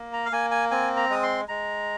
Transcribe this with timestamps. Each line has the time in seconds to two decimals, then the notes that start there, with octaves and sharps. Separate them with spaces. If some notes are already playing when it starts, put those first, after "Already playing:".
Already playing: A#3
0.13 A#5
0.25 F5
0.32 A#3 G#5
0.51 G#5
0.71 C4 G#5
0.97 A#5
1.10 G#3 D#6
1.23 C6
1.48 G#3 A#5